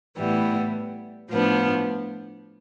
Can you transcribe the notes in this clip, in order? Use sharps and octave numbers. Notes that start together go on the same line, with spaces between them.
A2 E3 G3 B3
A2 F3 B3 D4